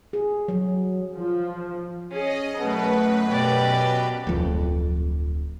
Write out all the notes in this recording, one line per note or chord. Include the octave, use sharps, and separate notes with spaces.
G#4
F#3
F3
C#4 G#4 D#5
F#2 B2 A3 B4
B2 G4 D5
D1 F2